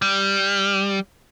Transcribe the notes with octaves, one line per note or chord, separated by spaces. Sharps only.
G3